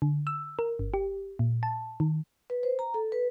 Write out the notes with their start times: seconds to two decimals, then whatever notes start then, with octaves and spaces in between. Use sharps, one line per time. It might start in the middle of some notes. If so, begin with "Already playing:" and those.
0.02 D3
0.27 E6
0.59 A#4
0.79 G1
0.94 G4
1.39 A#2
1.63 A5
2.00 D#3
2.50 B4
2.63 C5
2.79 A#5
2.94 A4
3.12 B4